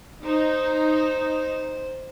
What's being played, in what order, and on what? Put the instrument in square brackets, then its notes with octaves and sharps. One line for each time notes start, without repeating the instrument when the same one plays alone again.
[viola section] D#4 [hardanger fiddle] C5